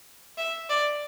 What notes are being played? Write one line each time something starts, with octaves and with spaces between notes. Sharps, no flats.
E5
D5